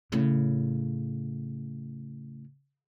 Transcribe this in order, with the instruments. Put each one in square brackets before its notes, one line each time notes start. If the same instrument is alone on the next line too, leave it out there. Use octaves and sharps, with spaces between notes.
[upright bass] A2 C#3